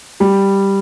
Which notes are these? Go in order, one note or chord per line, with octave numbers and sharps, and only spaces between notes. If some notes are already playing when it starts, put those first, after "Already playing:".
G3 G4